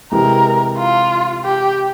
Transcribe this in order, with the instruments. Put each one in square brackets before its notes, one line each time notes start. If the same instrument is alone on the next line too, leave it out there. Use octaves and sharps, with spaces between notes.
[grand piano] C3 E3 G#3 [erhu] A#4
[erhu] F4
G4